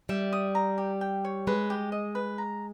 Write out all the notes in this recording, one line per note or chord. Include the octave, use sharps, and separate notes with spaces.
G3 E5
D#6
A#5
G4
G5
C#5
G#3 B4
G4
D#5
B4
A#5